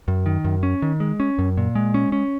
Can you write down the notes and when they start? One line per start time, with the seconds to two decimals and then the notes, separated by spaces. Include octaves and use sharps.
0.08 F#2
0.26 D#3
0.45 F#2
0.63 C#4
0.82 D#3
1.00 G#3
1.20 C#4
1.39 F#2
1.57 A#2
1.75 G#3
1.94 C#4
2.12 C#4